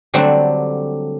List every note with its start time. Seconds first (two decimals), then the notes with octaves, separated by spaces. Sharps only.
0.14 D3 F#3 G3 A3 C4 D4